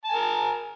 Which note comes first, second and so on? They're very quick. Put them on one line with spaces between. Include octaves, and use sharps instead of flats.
A5 G#5 A#4